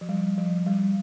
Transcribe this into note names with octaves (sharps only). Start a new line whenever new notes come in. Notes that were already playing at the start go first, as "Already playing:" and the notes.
F3
G3
F3
G3